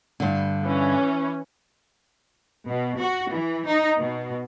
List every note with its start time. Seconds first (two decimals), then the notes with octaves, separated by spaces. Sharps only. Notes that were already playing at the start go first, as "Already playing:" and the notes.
0.20 G2 D3
0.64 E3 C#4
2.68 B2
2.99 F#4
3.31 E3
3.66 D#4
3.98 B2